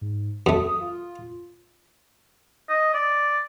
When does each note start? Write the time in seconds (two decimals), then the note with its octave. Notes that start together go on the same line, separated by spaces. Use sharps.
0.01 G#2
0.46 F#2 A3 D#6
0.81 F4
2.69 D#5
2.94 D5